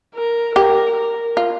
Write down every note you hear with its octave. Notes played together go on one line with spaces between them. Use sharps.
A#4
G4 A#4
A#4
F4